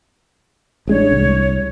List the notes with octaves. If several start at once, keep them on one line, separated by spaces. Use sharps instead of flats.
A1 G#3 D4 C#5
C2